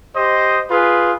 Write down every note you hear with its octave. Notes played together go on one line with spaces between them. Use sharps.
G4 C5 D#5
F4 G#4 B4